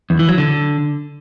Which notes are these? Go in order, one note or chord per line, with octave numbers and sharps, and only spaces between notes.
E2
E3
F#3
D3